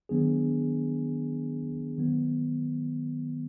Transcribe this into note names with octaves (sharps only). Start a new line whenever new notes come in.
D#3 F#3 B3 D4 G#4
D#3 F#3 B3